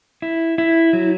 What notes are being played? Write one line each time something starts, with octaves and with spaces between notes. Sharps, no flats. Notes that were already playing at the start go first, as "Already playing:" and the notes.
E4
E4
F#3